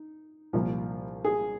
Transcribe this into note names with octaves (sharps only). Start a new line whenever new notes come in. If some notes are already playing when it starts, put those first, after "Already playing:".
Already playing: D#4
C2 A#2 F3
G#4